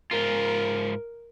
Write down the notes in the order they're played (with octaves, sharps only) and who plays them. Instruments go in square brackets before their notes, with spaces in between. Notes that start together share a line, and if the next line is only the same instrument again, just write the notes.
[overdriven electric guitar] G#2 F4 [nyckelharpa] A#4